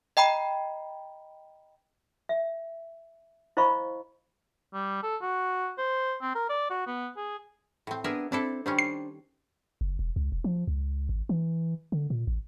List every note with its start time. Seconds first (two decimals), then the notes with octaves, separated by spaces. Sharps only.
0.17 D#5 G5 A#5 B5
2.29 E5
3.57 E4 C5 D#5 F5 B5 C#6
4.74 G3
5.03 A4
5.22 F#4
5.78 C5
6.21 C4
6.35 A#4
6.49 D5
6.70 F#4
6.87 B3
7.16 G#4
7.87 A2 C4
8.04 B3 D4 G#4 A#4 E5
8.32 C4 D4 E4 A4
8.66 D#3 G3 C#4 D4 C5
8.79 C7
9.81 F#1
9.99 E1
10.16 C#2
10.32 E1
10.44 F3
10.67 C#2
11.09 G#1
11.29 E3
11.92 D3
12.10 A#2
12.27 A1